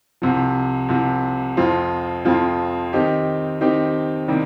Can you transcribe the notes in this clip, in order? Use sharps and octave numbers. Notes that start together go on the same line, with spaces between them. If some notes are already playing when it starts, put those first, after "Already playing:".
C2 C3 F3
C2 C3 F3
F2 F3 C4 F4
F2 F3 C4 F4
D#3 C4 D#4 G4
D#3 C4 D#4 G4
C3 D#3 G3 A#3